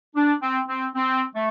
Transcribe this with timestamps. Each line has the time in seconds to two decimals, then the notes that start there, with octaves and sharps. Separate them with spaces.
0.15 D4
0.41 C4
0.68 C4
0.95 C4
1.35 A3